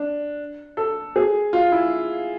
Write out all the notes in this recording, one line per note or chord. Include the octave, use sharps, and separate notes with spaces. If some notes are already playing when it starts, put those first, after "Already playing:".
Already playing: D4
A4
G#4
F4
E4